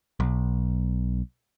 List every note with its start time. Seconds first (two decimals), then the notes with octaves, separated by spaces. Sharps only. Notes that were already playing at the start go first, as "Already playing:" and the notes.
0.20 B1